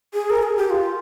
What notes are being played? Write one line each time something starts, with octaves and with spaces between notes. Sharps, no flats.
G#4
A#4
G#4
G4
F4